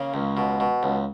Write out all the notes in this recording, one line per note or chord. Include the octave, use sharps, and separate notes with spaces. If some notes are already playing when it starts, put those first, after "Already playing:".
Already playing: C#3 A#3 C#4
C#2
B2
B2
C#2